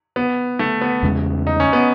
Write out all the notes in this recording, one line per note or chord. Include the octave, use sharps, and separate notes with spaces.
B3
A3
B3
E2 C#3 G#3
D#4
C#4
B3